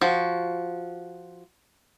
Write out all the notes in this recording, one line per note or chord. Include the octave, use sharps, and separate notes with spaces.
F3 F#4